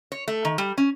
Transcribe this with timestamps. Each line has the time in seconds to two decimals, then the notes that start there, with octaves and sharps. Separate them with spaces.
0.12 C#5
0.28 A3
0.45 D#3
0.58 G3
0.78 C#4